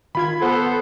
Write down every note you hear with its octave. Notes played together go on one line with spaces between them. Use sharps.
D#3 F4 B5 G#6
B3 A4 C5 F#5